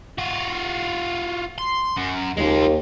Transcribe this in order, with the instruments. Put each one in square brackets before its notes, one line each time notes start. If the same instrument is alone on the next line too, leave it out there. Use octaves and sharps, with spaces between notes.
[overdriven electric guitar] F4 F#4
C6
F#2
[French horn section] D#2 [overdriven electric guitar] G#3 F4